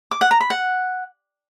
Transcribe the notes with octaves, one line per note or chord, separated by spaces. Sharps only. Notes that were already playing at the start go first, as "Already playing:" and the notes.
D6
F#5
A#5
B5
F#5